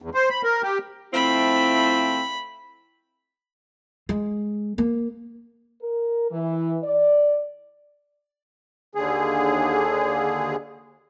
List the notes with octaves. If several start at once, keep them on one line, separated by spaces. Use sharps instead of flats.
E2
C5
B5
A#4
G4
F3 A3 C4 E4 B5
G#3
A#3
A#4
E3
D5
D#2 D3 G#4